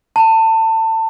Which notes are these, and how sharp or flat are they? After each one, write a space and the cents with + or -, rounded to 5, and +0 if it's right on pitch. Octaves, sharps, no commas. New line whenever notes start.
A5 +25